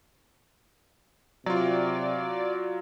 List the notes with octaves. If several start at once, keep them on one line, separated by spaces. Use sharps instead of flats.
C3 F#3 F4 D5